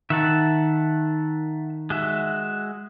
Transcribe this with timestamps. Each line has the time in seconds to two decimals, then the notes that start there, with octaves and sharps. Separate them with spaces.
0.10 D#3 E5 F#5 A5
1.90 G#3 F#4 E5